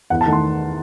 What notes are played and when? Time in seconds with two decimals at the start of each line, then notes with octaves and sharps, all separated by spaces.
0.10 E2 F#5
0.21 A5
0.26 D#3 A3
0.33 C6